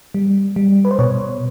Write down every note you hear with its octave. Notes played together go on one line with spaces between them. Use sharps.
G3
G3
B4
C5
B2 C#5